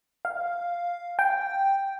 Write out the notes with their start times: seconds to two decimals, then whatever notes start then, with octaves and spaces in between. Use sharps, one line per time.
0.25 F5
1.19 G5